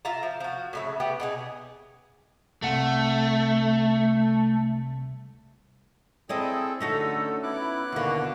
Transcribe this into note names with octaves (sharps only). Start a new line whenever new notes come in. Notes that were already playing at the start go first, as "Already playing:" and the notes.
F4 E5 A5 A#5
F3
F3 F#4
A2 C#3 E5
B3 G4
B2 D#4 G#4
C2 A3 F#5
C4 E4 G#4 A4 D5 D#5
D3 A3 C#4 D#4 F#4 A4
B3 E4 D6 F#6
D#2 B2 D3 A#3 F#4